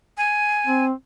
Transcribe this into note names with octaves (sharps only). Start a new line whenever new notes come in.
G#5
C4